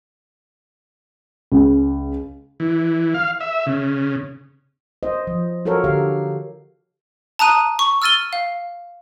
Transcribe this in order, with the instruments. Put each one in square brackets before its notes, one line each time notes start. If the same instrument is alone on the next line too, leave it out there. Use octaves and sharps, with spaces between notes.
[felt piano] C#2
[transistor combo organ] E3
F5
E5
C#3
[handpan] C5 D#5
F3
F4 F#4 A4 A#4 C#5
D3 G4 F5
[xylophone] A5 A#5 D#6 F#6 D#7
C#6
E6 F6 A6 D#7 G7
F5